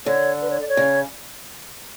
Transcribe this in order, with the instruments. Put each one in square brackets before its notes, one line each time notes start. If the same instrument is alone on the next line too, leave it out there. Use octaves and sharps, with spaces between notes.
[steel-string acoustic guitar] D3 [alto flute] C#5
[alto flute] B4
C#5
D5
C#5
[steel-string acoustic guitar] C#3